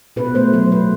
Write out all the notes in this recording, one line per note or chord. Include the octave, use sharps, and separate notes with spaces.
B2 B4
A3 C5
F#3 C5
B2 B4